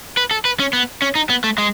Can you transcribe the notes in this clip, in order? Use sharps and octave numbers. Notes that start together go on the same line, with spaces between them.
B4
A4
B4
C#4
B3
C#4
D#4
B3
A3
G#3